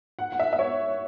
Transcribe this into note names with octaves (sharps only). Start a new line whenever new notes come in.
F#5
F#5
E5
E5
C#5